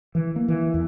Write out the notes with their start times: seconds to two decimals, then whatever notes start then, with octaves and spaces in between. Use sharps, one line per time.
0.15 E3
0.36 A#3
0.48 E3
0.74 E2